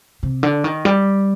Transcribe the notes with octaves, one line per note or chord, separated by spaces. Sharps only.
C3
D3
D#3
G3